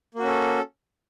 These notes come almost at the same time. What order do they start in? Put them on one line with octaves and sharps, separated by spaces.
A#3 F#4 C#4 A4